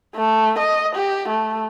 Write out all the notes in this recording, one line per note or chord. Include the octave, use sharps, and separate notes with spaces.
A3
D#5
G4
A3